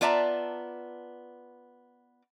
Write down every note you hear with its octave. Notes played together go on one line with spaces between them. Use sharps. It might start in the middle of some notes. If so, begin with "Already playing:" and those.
B3 F4 D5 E5 A5 A#5